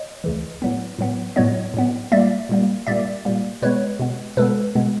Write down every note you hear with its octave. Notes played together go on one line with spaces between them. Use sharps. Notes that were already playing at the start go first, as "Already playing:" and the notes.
Already playing: C#5 D#5
D2 C#3 E3
A2 F#3 B3
A2 F#3 B3
A2 F#3 B3 C#5 D#5
A2 F#3 B3
A#2 G3 A#3 D5 E5
A#2 G3 A#3
A#2 G3 A#3 D5 E5
A#2 G3 A#3
B2 G#3 B3 B4 C#5
B2 G#3 B3
B2 G#3 B3 A4 B4
B2 G#3 B3